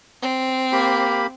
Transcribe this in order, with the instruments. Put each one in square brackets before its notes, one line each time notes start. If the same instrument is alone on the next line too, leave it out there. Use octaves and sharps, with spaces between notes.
[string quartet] C4
[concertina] A#3 G4 B5